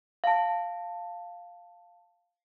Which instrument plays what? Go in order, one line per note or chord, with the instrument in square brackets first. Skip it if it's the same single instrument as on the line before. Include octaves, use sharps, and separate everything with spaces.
[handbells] F5 A5